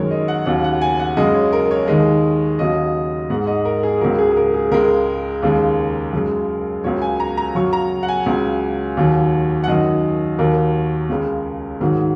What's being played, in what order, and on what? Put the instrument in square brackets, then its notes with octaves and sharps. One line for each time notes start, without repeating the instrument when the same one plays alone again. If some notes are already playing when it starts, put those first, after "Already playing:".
Already playing: [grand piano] F#2 D#3 G#3 A#4 C#5
D#5
F#5
D#2 C#3 F#3 F#5
F#5
G#5
F#5
F#2 C#3 G#3 D#5
C#5
A#4
C#5
D#2 D#3 G#3 D#5
D#2 C#3 F#3 D#5
G#2 G#3 F#5
D#5
A#4
G#4
C#2 C#3 F#3 A#4
G#4
G#4
A#4
G#4
C#2 C#3 G#3 A#4
D#2 C#3 G#3
F#2 C#3 G#3
C#2 C#3 F#3 C#5
G#5
A#5
A#5
F#2 C#3 F#3 C#6
A#5
F#5
G#5
C#2 C#3 F#3
D#2 D#3 F#3
F#5
F#2 D#3 F#3 D#5
D#2 D#3 F#3 A#4
C#2 C#3 G#3
G#2 D#3 F#3